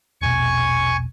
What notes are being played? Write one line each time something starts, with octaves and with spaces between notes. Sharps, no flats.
E1 A#1 B2 G#5 C#6